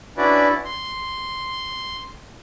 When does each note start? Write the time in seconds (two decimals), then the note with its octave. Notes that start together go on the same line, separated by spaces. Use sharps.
0.17 C#4 D4 E4 F#4 B4 D5
0.65 C6